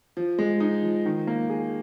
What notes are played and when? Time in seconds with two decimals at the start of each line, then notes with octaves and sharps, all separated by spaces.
0.17 F3
0.39 G#3
0.60 D#4
0.83 F3
1.06 D#3
1.27 A#3
1.50 G#4